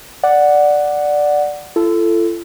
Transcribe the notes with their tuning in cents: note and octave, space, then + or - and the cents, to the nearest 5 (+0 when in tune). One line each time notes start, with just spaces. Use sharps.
D5 +0 F#5 +0
F4 -45 A4 +0